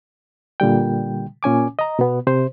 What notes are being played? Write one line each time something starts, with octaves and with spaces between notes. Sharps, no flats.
A#2 D3 G3 G5
A#2 C#4 G#5 D6
D#5 A#5
B2 B3
C3 C5